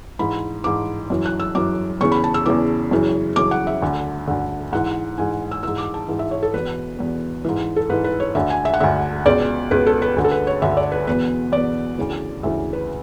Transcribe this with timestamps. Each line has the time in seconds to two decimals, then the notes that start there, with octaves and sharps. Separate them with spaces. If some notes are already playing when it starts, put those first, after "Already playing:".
0.19 G#2 E3 B5
0.64 G#2 E3 D6
1.10 F#2 E3
1.26 F#6
1.40 E6
1.55 F#2 E3 D6
2.01 E2 C#3 E3 C#6
2.12 B5
2.24 A5
2.34 E6
2.46 E2 C#3 E3 D6
2.91 F#2 C#3 E3
3.36 F#2 C#3 E3 D6
3.51 F#5
3.67 E5
3.82 D2 D3
4.27 D2 D3
4.72 G#2 E3 F#5
5.18 G#2 E3 G#5
5.51 E6
5.63 G#2 E3 E6
5.78 D6
5.94 A5
6.08 G#2 E3
6.19 E5
6.31 C#5
6.43 A4
6.54 E2 B2 B4
6.99 E2 B2
7.45 G#2 E3
7.76 A4
7.89 G#2 E3 B4
8.04 B4
8.20 C#5
8.35 D2 D3 E5
8.50 G#5
8.65 E5
8.74 F#5
8.80 D2 D3 E5
9.26 C#2 B2 D5
9.71 C#2 B2 B4
9.87 A4
10.02 B4
10.16 D2 D3
10.24 A4
10.31 B4
10.47 C#5
10.62 D2 D3 E5
10.77 D5
10.92 B4
11.07 E2 B2 B4
11.52 E2 B2 D5
11.98 D2 C#3 E3
12.43 D2 C#3 E3 E5
12.73 B4